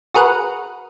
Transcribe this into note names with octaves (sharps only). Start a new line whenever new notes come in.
F#4 G#4 A#4 B4 F#5